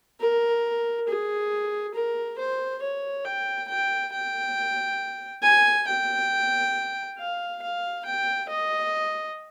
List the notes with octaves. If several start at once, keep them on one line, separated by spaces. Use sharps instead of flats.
A#4
G#4
A#4
C5
C#5
G5
G5
G5
G#5
G5
F5
F5
G5
D#5